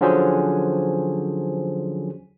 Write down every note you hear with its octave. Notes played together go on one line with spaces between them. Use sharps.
D3 F3 F#3 C#4 G#4 C5